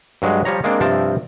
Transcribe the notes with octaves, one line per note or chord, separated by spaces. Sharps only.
G2 F#3 G#3
F3 G3 C#5 A#5
G#3 A#3 C4 D4
G2 C3 F3 C4 G5 A5